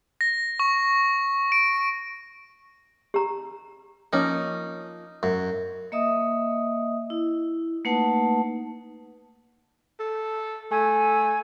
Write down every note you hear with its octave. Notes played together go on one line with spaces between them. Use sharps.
A#6
C#6
D7
G4 A#5
F3 A#3 C#4 D#4
F#2
A#3 D#5 E5 D#6
E4
A3 A#3 D#4 B4 F#5 A5
A4
A3 G#5